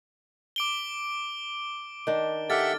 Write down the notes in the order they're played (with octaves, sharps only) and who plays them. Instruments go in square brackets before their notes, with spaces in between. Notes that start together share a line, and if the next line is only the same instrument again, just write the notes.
[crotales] D6 D7 G7
[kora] D#3 D4
[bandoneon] G4 E5 F#5 [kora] A4 [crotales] F6 A6